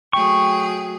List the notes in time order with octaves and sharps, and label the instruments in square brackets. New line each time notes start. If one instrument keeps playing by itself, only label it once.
[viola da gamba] F#3 A3 G#4 [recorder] G5 [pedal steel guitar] C#6